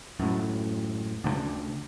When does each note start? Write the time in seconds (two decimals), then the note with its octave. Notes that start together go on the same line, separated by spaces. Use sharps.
0.19 F#2 A2
1.24 D2 C#3 G#3 D4